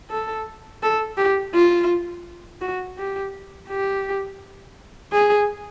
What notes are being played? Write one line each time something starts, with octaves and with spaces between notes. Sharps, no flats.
A4
A4
G4
F4
F#4
G4
G4
G#4